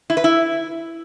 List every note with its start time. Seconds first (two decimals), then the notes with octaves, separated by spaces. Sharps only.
0.10 E4
0.17 B4
0.24 E4